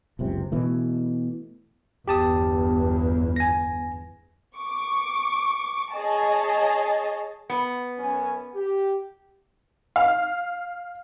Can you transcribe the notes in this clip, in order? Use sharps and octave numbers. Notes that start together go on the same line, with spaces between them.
F#1 C#2 C3
B2 E3 A3
G1 E2 G4 A5 D#6
G#5 A#6
C#6 D6
G#4 C#5 D#5 A5
B3
F#2 C#4 G#5
G4
F5